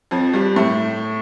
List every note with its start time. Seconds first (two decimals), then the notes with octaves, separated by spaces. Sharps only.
0.11 F2 F3
0.34 G2 G3
0.56 A2 A3